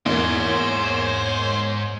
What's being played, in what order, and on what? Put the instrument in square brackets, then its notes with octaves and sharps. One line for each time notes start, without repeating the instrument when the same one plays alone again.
[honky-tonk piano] E2 A#3 [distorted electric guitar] G#2 [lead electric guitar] C5 [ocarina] C#5